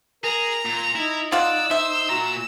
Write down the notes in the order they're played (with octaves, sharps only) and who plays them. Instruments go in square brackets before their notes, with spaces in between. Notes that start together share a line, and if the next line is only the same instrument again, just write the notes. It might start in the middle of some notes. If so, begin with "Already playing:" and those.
[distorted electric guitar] G#4 [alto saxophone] A#4 [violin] A#5
[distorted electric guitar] A#2
[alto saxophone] D#4 [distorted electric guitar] E4
[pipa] F4 F#5 [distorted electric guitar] D5 [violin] E6
[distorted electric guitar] C5 [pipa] E5
[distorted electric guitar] A#2 A#5 [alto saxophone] F#4